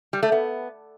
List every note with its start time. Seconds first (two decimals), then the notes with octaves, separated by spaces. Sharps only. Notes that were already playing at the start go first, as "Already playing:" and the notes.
0.13 G3
0.23 A3
0.32 B3